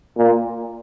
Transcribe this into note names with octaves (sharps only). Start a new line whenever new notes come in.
A#2